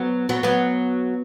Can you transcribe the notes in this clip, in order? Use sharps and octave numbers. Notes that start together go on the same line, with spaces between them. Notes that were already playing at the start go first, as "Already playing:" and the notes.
Already playing: F#3 B3
F#3 B3
F#3 B3